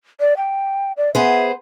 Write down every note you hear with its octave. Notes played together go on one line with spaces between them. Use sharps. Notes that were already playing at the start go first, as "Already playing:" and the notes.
D5
G5
D5
B3 G#4 C5 E5